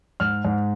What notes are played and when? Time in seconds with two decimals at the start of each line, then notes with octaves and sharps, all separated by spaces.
0.20 G#2 F6
0.45 G#2